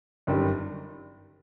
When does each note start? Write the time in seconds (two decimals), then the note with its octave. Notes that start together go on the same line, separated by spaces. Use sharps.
0.27 G1 F#2 D#3 G3